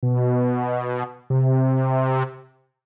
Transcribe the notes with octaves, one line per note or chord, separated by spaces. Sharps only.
B2
C3